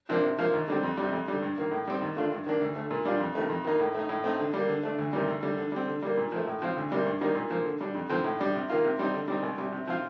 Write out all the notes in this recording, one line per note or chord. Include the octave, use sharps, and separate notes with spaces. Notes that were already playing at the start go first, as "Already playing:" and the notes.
C3 F3 A#3 D4
C3
F3 A#3 F4
D#2
D3 G3 C4
F2
C3 G3
F2
D3 G3
G2
D#3 A#3
A2
G3 C4
D#2
D3 A3 D4 F4
G2
D#3 A#3 D4
D2
D3 A3
A#2
G3 D4 F4
F2
C3 D#3 A3
F2
D#3 A#3 D#4
A2
A3 D#4
A2
A3 C4 D#4
D3
G3 A#3
D3
A3 D4
D2
C3 D#3 G3
D2
D3 G3
D3
G3 C4
D3
G3 A#3
A#2
F3 A3
A2
F3 C4 F4
D2
C3 G3 A#3
G2
D#3 G3 A#3 D#4
A#2
F3 A#3
D3
G3 D4
F2
D3 F3 C4
A2
G3 D4
C3
D#3 A#3 F4
C3
G3 C4 D#4
D3
G3 C4 D#4
C2
C3 G3
C3
F3 C4 F4